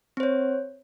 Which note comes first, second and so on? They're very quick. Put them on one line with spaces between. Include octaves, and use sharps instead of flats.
C4 C5 C#5